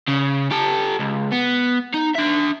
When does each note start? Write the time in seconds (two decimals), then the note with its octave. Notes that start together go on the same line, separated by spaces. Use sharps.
0.08 C#3
0.51 G4 A4
1.00 C#2
1.32 B3
1.94 D#4
2.15 D4 E5